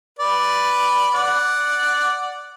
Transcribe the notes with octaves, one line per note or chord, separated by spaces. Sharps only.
B4 D5
D5 F#5